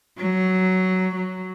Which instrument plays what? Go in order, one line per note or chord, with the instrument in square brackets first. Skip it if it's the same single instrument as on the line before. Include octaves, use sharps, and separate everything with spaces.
[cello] F#3
F#3